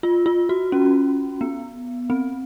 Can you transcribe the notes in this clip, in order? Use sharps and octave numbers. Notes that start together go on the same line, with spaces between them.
F4
F4
F#4
C#4
B3
C4